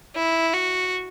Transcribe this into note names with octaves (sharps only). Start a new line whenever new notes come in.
E4
F#4